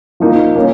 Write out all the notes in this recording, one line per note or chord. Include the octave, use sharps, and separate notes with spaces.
F3 A#3 D#4
A#3 C#4